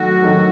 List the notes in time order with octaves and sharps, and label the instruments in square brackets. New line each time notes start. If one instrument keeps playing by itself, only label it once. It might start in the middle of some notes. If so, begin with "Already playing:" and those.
Already playing: [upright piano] D#3 F#3 A3 [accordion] F#4
[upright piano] D#3 F#3 A3